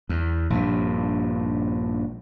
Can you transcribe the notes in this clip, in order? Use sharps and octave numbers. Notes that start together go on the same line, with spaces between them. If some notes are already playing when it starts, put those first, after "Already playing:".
E2
A#1 G2